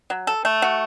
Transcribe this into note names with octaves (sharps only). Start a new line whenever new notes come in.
F#3
A4
A3
F#4